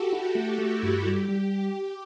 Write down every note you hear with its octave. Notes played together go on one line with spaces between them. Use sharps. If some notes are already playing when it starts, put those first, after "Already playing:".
Already playing: F#4 G4 A4
E4 A4
A3
F#4
A3
E4
G2
G3 G4
G3